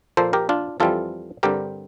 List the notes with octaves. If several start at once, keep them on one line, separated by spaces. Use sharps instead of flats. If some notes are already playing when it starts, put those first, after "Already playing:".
A#2 F3 A#3 A4 C5
G4 A#4
D4 F4
F2 E3 G3 C4 F4 A4
G2 D3 G3 C4 G4 A#4